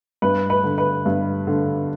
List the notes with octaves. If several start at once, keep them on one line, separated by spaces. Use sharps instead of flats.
G2 B4
B4
D3
B4
G2
D3